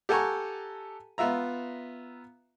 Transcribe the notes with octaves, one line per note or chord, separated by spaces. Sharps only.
G4 A4 F#5 G#5 A#5 C#6
B3 F4 E5 A#5